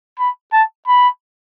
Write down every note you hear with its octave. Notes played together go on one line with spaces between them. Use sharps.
B5
A5
B5